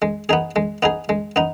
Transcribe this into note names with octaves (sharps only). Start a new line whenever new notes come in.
G#3
B3 D#4 G#4
G#3
B3 D#4 G#4
G#3
B3 D#4